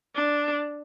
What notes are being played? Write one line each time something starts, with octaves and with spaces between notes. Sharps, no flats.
D4